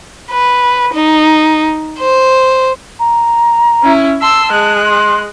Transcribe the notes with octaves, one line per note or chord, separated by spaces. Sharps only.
B4
D#4
C5
A#5
C#4 E4
A5 C6 E6
G#3 F#6
C6